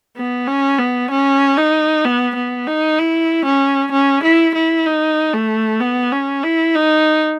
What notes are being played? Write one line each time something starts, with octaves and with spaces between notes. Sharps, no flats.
B3
C#4
B3
C#4
D#4
B3
B3
D#4
E4
C#4
C#4
E4
E4
D#4
A3
B3
C#4
E4
D#4